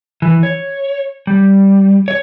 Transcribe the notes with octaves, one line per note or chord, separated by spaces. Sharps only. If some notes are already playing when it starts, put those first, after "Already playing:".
E3
C#5
G3
C#5